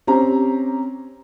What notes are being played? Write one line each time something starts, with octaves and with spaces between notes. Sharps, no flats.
C4 C#4 G4 A#5